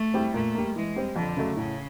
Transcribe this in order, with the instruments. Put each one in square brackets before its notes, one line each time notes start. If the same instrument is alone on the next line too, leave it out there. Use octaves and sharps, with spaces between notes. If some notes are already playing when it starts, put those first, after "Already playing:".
Already playing: [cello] A3
[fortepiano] G3 C4 E4 G4
[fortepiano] A#2 [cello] A3
[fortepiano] G3 A#3
[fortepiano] E3 [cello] G#3
[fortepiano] G3 C4
[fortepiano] F2 [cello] D3
[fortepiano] C#3 F#3 A3
[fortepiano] A2 [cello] C#3